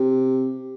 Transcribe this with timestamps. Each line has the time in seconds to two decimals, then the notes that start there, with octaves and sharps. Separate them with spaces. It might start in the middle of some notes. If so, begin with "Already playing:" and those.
Already playing: C3